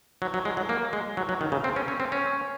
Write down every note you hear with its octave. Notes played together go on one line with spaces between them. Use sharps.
F#3
F#3
G#3
F#3
A#3
G#3
F#3
F#3
D#3
C#3
C4
C#4
C#4
C4
C#4